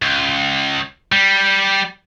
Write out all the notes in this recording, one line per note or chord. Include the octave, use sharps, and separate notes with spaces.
C#2
G3